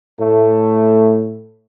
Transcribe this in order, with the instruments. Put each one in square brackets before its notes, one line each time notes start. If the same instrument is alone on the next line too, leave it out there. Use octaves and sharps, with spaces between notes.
[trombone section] A2 A3